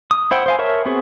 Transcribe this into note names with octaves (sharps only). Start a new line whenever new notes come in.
D#6
E4 C5 F#5 G5
C5 F5 G#5
A#4 C#5 E5 A5
B3 C4 F#4 G#4